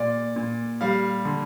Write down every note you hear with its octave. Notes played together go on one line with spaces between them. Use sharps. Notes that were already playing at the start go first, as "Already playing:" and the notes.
Already playing: A#2 D5
A#2
G3 F5
D3